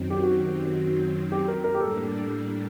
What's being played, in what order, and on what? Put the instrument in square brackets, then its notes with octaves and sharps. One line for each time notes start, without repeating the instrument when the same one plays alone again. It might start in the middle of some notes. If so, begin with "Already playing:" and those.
Already playing: [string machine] F#2 D#3 F#3 C4
[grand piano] G4
F#4
G4
A#4
A#4
G4
[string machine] A2 G3 A#3 D4 [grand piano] A4